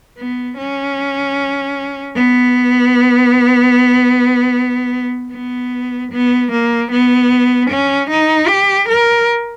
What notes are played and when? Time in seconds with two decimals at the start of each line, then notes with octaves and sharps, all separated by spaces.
0.18 B3
0.58 C#4
2.15 B3
5.32 B3
6.12 B3
6.51 A#3
6.91 B3
7.70 C#4
8.10 D#4
8.49 G4
8.89 A#4